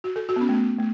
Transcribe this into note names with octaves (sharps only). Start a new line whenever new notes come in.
F#4
A4
F#4
B3
C#4
A3
B3
A3